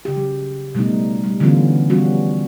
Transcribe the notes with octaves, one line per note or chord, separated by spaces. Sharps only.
C#3 G4
F#3
B2 G3 A3 B3 D#4
G3
D3 E3 F#3 B3 C#4 F4
F3 G3 B3 C#4 F4 F#4